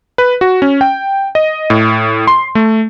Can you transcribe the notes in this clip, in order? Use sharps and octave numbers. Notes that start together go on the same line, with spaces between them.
B4
F#4
C#4
G5
D#5
A2
C6
A3